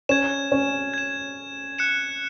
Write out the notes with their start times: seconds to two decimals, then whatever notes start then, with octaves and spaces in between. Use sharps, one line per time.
0.09 C#4 G#6 E7
0.52 C#4
0.94 G#6 E7
1.79 F#6 C#7 E7